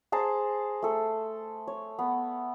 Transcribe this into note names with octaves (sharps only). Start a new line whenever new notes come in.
G#4 C5 A5 A#5
A3 A4
C#5
B3